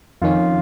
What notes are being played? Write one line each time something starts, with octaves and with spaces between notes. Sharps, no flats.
F2 D#3 C#4 F4